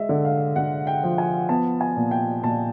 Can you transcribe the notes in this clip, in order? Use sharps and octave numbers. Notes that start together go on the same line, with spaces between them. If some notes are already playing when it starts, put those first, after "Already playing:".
Already playing: G#3 D#5 E5
D3
F5
D3 F#5
G5
F3
G#5
B3 A5
G#5
A#2
G5
A#2 A5